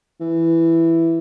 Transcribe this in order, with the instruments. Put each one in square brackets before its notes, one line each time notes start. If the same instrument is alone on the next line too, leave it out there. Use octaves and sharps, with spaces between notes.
[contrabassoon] E3